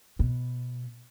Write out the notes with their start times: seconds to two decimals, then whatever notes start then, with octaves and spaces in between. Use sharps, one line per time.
0.19 B2